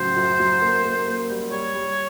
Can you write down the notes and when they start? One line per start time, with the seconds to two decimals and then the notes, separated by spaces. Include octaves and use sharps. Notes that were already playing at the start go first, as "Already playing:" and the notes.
Already playing: A2 C#3 F#3 C5
0.16 F#2
0.40 F#3
0.62 A#3
0.84 A#3
1.06 A#3
1.29 G3
1.51 G3 C#5
1.74 G3